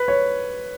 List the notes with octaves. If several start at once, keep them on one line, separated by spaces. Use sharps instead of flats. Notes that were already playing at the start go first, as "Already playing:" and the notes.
Already playing: B4
C#5